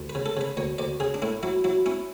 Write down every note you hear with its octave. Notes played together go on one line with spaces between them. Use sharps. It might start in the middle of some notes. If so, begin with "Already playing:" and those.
Already playing: D2
B4
C#3
A4
C#3 B4
D2 C#5
D2 D5
C#3 G#4
D4
A2 E4
F#3 E4
F#3 E4
C#4 E4